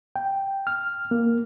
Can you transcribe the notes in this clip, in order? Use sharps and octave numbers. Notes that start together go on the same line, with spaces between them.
G5
F6
A#3